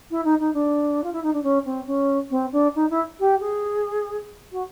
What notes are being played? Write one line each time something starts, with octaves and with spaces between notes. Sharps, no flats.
E4
D#4
D#4
D4
F4
E4
D#4
D4
C#4
C4
C#4
C4
D4
D#4
E4
G4
G#4
F#4